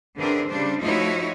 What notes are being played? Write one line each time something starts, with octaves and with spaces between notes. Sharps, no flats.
D3 E3 C4 D4 G#4 A#4
C#3 G3 D4 C5
F3 A3 D#4 E4 F#4 C#5